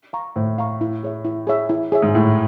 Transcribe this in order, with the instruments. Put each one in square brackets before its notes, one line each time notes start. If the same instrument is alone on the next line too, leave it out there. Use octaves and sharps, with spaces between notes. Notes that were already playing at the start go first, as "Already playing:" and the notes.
[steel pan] F5 A#5 C#6
[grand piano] A2 [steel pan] C5
[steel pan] F5 A#5 C#6
E4
G#4 C#5 E5
E4
G#4 C#5 E5
E4
G#4 C#5 E5
[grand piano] G#2
[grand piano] A2 [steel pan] E4